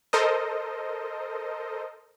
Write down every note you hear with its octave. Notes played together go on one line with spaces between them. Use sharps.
A4 A#4 C5 D#5